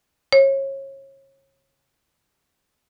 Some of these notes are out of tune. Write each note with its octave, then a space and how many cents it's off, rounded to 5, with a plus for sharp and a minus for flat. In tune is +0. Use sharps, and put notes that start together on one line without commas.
C#5 -30